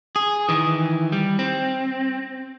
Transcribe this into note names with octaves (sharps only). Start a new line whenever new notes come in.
G#4
D#3 E3
G3
C4